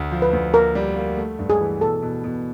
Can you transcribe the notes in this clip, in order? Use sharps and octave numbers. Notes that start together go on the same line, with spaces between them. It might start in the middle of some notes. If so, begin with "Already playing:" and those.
Already playing: D2
F3
B4
D2
A#3 A#4
G3
A#3
A3
G2
G#4
E3
B2 A4
B2
B2